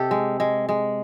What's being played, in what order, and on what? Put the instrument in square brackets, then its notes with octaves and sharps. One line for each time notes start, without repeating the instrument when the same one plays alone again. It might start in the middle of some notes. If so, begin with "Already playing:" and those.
Already playing: [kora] C3 G4 A4 D#5
G#3
G#3
G#3